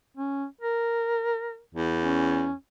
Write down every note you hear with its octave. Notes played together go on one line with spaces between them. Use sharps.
C#4
A#4
E2
C#4